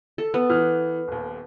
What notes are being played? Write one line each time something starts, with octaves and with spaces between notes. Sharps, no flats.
A4
B3
E3 F6
D#1 D#2